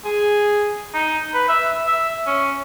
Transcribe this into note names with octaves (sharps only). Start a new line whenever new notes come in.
G#4
D#4
B4
E5
E5
C#4